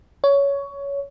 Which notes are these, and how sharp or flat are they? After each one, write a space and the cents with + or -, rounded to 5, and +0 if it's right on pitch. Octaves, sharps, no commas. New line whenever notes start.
C#5 +15